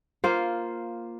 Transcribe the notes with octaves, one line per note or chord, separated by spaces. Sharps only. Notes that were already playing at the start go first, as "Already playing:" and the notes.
A#3 F4 C5